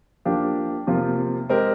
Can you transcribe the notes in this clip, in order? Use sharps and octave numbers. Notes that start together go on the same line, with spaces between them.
F3 A#3 D4 G4
C3 F3 A#3 F4
G#3 C4 G4 A#4